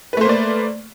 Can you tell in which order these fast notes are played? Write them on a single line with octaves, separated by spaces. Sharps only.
B4 A3 C5 A#3 D5